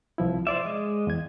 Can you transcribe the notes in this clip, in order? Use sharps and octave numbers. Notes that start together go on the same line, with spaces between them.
C2 F3 E4
C5 D5 E5 D6
G#3 D#5
E2 G#6